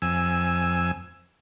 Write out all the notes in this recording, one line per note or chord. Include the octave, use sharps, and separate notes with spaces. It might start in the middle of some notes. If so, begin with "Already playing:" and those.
F2 G#5 E6